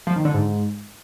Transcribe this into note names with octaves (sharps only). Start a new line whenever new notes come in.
F3
D#3
D3
G#2